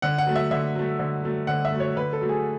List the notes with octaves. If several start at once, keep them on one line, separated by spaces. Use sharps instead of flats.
D3 F#5
F#5
F#3 A3
E5
D3 E5
F#3 A3
D3
F#3 A3
D3 F#5
E5
F#3 A3
C#5
D3 B4
A4
F#3 A3
G#4